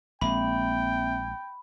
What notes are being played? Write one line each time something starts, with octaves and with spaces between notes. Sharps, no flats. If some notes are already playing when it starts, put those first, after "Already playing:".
A#1 G#3 A#3 C4 E5 G5 B5